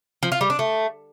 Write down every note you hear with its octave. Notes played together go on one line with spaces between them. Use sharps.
F3
F4
G3
D4
A3